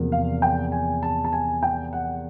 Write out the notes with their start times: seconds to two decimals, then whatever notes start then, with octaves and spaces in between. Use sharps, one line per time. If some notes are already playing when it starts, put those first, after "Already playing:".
Already playing: E2 C3 F3 A#3
0.12 F5
0.42 G5
0.72 G#5
1.03 A5
1.25 A5
1.33 G#5
1.63 G5
1.93 F#5